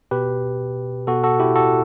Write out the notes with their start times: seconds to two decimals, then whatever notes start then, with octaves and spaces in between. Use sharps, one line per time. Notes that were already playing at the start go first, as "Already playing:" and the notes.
0.11 B2 G4 B4
1.07 B2 F#4 A4
1.24 F#4 A4
1.40 E4 G4
1.55 F#4 A4